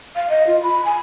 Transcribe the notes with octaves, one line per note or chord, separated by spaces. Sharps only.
F5
D#5
F4
B5
G#5